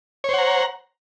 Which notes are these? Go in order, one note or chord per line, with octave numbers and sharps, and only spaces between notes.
C5 C#5 F#5 A#5